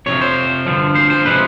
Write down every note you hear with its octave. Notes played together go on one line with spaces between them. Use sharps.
F2 C3 F3 C#5
C5
G2 D3 F3
C5
C5
C3 F3 G#3 B4